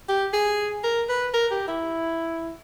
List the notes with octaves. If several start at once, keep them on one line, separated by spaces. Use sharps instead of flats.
G4
G#4
A#4
B4
A#4
G4
E4